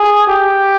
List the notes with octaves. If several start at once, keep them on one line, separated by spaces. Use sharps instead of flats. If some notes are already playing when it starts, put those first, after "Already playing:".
Already playing: G#4
G4